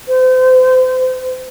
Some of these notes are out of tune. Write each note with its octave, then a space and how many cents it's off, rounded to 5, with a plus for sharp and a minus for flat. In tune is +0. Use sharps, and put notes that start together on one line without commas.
C5 -35